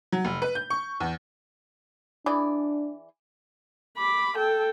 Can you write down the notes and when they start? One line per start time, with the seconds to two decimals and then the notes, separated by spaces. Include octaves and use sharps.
0.12 F#3
0.25 F1
0.42 B4
0.55 G6
0.70 C#6
1.00 E2
2.26 E3 D4 G#4 D5
3.98 B5 D6
4.37 A4 G5